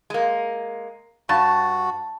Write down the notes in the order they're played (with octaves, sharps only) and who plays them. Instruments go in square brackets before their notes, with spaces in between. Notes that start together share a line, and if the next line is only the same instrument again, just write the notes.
[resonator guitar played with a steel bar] G#3 A#3
[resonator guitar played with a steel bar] G2 [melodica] F#4 [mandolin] A5